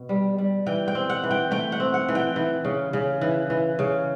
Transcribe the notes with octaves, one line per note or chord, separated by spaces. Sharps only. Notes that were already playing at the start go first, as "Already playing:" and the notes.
Already playing: B2
G3
G3
E3 G5
G5
C4
F#5
E3
G5
A3 G5
F#5
C4
F#5
E3
G5
E3
C#3
C#3
E3
E3
C#3